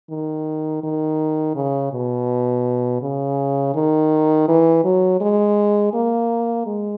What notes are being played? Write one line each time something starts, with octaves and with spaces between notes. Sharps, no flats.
D#3
D#3
C#3
B2
C#3
D#3
E3
F#3
G#3
A#3
G#3